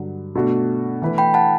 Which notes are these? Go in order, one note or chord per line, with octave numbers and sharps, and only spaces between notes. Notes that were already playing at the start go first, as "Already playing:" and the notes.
Already playing: G2 D3 F#3
B2 A3 D4 F#4
E3 A3 E4 B4
G5 B5
F#5 A5